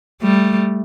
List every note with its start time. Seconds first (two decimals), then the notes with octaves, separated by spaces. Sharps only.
0.22 G3 A3